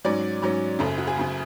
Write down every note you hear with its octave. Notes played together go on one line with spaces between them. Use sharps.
G#2 F#3 C#4 D5
G#2 F#3 C#4
F#1 F#2 C#3 A4
F#4
G#4
F#1 F#2 C#3